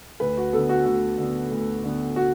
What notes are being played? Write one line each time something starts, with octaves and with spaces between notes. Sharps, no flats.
D2 B4
F#4
D3 B3 A4
F#4
D2 F#4
D3 B3
D2
D3 B3
F#4